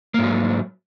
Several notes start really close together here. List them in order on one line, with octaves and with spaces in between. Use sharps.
A#3 G#2 F#3